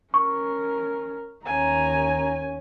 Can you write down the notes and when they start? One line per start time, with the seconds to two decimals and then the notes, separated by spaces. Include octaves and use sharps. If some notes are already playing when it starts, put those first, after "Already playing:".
0.14 C#4 A#4 C#6
1.46 D#2 C#4 G#5 A#5